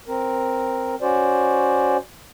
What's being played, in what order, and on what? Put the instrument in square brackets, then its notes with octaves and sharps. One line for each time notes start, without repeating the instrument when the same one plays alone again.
[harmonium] C4 A#4
C#4 F#4 C5 D5